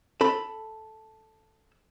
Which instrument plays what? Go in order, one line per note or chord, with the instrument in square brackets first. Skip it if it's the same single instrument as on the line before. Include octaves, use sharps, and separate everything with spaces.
[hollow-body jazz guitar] A4 B5